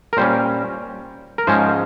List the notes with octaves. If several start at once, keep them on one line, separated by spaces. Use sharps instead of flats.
A#4
A#2 G3 C#4 C5
A#4
G#2 F3 G#3 C#4 C5